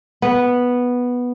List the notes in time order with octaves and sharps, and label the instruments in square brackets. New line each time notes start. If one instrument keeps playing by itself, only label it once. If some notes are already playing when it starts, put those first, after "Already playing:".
[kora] B3